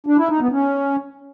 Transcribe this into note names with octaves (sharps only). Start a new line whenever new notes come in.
D4
E4
D#4
B3
C#4